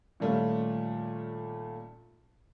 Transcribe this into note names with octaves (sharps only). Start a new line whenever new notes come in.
A#2 D#3 G3 A3 C#4 F4